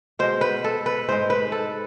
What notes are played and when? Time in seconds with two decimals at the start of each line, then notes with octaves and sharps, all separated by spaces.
0.19 B2 G#3 C5
0.41 B4
0.64 A4
0.86 B4
1.08 G#2 G#3 C5
1.30 B4
1.52 A4